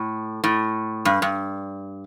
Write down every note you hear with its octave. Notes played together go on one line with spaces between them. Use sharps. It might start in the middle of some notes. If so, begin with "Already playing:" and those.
Already playing: A2
A2
G2
G2